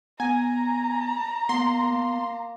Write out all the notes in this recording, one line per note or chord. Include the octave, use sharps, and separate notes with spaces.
B3 G#5 A#5
A#3 B3 D#5 C6
A#3